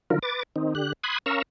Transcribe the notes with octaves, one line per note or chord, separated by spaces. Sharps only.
D3 D#3 F3 F#3 F4 A#4
B4 D6 A6
D#3 C4 D#4
D3 G4 F#6
B5 C6 D#6 F#6 G#6
C#4 A#4 F5 A#5 C#6 E6